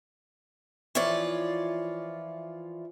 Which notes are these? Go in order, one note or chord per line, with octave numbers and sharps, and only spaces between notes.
E3 F3 F4 C#5 D5